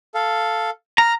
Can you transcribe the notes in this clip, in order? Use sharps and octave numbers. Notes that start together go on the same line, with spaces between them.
A4 F5
A#5 F6